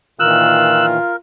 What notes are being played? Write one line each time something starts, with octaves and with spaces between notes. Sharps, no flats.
A#2 D#3 E3 F4 A#4 E6 F#6